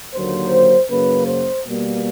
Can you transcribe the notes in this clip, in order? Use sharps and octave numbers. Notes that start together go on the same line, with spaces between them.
D#2 D3 F#3 A#3 C5
F#2 C#3 F#3 A#3 B4
C5
B2 G3 A#3